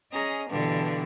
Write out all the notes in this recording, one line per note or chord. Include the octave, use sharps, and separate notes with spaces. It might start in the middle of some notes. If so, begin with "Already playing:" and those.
C#4 G#4 D#5 A#5
G2 B2 D3 E3